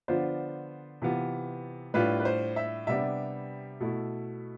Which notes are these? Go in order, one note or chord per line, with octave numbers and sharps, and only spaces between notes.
D3 F3 B3 D4 F4 C5
C3 E3 B3 F4
A2 G3 D4 F4 B4
B4
C5
E5
C3 G3 B3 D4 E5
B2 A3 E4